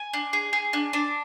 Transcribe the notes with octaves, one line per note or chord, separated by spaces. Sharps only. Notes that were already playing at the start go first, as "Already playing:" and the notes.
Already playing: G#5
D4
G#4
G#4
D4
D4